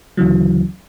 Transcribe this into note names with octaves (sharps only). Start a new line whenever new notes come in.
D2 C#3 E3 F#3